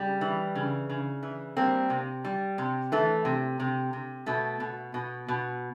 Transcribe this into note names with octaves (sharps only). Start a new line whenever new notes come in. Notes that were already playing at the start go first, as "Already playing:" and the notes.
Already playing: C#3 G3
E3
C#3
C#3
E3
G3 A#3 C4
C3
G3
C3
E3 A3
C3
C3
C3
B2 A3
B2
B2
B2